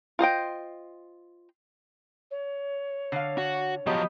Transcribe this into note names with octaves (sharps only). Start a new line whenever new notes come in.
F4 C5 D#5 G5
C#5
D3 F5
F#4
F3 F#3 B3 G4 D#5